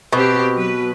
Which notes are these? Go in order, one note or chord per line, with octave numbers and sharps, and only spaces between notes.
B2 C4 G4
F#3 B4